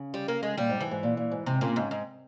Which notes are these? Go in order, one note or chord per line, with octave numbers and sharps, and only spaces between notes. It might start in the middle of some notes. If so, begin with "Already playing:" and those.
Already playing: C#3
G3
A#3
G#3
A#2 G3
G#2
G#2 E3
G#2
A#2
A#2
G#2
G#2 C3
A#2 C#3
G#2 C#3
G#2